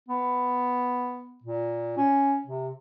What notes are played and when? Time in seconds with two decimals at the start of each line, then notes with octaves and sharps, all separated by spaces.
0.09 B3
1.44 A#2
1.97 C#4
2.47 C3